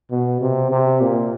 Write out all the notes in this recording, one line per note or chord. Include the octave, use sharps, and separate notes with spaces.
B2
C3
C3
A#2